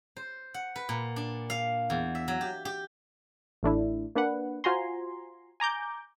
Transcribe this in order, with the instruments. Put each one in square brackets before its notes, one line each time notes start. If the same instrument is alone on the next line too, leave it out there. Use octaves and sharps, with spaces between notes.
[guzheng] C5
F#5
B4
A#2
D4
F5
E2
E5
F#3
G4
G4
[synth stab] A1 A3 D4 E4
A#3 D4 B4 F#5
F4 F#4 C5 G#5 A#5 C6
G#5 A#5 D6 G6